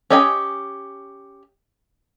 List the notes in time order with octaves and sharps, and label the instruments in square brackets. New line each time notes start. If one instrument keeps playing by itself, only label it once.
[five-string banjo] C#4 G4 D#5 G#5 B5